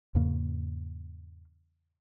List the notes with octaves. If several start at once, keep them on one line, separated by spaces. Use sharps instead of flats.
E2 G#2 C#3 A#3